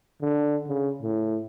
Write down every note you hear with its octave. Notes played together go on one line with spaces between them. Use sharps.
D3
C#3
A2